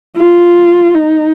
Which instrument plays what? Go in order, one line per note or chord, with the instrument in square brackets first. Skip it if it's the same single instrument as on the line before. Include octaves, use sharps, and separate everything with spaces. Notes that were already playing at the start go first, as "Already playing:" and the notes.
[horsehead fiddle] F4
D#4